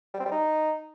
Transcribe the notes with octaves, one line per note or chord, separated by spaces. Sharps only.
G3
C4
G3
D#4